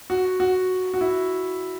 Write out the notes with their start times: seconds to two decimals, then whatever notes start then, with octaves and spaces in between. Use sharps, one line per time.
0.10 F#4
0.40 F#4
0.94 F#4
1.01 E4